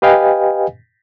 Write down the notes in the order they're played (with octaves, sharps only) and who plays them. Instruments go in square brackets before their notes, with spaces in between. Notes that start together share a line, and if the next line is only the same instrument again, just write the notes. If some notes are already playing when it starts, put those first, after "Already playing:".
[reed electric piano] G4 B4 D#5 F5 G5 G#5